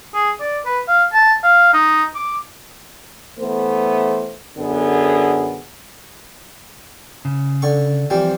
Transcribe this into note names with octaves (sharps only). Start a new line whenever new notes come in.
G#4
D5
B4
F5
A5
F5
D#4
D6
E3 A3 B3 C5
F#2 D3 B3 G#4
C#3
D3 C#6
E3 F3 G3 C4